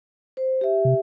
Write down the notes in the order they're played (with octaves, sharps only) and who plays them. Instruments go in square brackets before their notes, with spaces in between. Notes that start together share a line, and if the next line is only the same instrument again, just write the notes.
[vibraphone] C5
G4 E5
[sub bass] C3